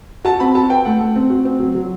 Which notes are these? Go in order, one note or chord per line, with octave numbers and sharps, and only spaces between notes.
F#4 A5
C4 B5
F#4 A5
B4 G5
A3 F#5
A3
C4
F#4
C4
F#3
F#3